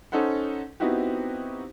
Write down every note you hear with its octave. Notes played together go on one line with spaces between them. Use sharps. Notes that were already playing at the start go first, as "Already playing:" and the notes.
C#4 D#4 A4 C5 F#5
B3 C4 D#4 E4 F#4 G4